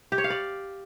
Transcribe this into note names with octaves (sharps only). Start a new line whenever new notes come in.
G4
C#5
F5
D5